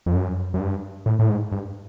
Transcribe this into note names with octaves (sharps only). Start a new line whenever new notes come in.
F2
F#2
F#2
G2
A2
A2
G#2
G2